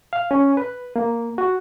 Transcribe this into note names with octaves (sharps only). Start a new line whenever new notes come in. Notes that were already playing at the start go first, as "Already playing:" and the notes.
F5
C#4
B4
A#3
F#4